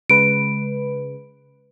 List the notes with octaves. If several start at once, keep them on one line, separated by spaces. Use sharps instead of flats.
C#3 G#3 B4 D7